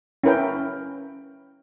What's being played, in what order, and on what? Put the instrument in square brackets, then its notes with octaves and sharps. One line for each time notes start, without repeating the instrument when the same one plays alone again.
[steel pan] C#4 E4 A#4 B4 G5